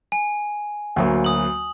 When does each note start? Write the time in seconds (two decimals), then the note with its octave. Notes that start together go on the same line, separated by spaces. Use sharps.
0.12 G#5
0.96 D2 F#3 A#3
1.24 D#6 F#7